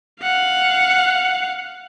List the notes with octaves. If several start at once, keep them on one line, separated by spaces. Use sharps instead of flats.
F5 F#5